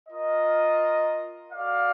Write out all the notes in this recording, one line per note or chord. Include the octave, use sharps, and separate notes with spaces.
F4 A#4 D#5
F#4 A4 D5 F5